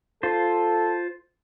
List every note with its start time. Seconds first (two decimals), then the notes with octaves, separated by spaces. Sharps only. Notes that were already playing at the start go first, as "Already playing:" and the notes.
0.23 F4 A4 C5